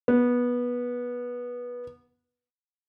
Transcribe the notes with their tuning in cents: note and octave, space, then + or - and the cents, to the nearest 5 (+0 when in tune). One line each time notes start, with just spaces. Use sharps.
B3 -15